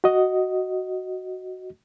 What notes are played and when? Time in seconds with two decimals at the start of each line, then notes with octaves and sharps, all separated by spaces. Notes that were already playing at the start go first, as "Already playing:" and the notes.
0.04 F#4 D#5